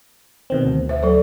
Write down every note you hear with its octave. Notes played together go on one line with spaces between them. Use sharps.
B2 D#3 C4
D2
C5 E5
F#3 A4 C5